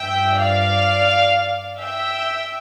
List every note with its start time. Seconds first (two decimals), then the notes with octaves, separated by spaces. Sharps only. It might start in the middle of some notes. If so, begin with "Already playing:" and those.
Already playing: G2 F3 E5 G5
0.38 D5 F5
1.79 E5 G5